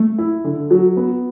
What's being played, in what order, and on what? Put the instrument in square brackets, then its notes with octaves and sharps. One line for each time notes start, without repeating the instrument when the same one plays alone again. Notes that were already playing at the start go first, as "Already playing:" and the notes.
Already playing: [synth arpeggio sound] A3
[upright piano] E4
D3
F#3
B3